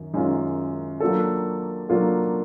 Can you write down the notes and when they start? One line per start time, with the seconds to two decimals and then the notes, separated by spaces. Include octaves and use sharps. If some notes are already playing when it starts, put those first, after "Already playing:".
Already playing: F#2 D#3
0.13 F#2 D#3 G#3 C#4 F4
1.00 F#3 A#3 D4 F4 A4
1.89 F#3 A#3 D4 F4 A4